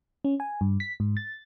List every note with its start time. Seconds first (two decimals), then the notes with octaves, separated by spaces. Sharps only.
0.24 C#4
0.40 G#5
0.61 G2
0.80 B6
1.00 G#2
1.17 A6